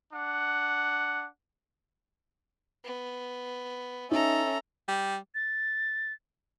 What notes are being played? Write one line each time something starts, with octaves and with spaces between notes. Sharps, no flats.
D4 F#5
B3
C#4 D#4 A4 E5 A#5
G3
A6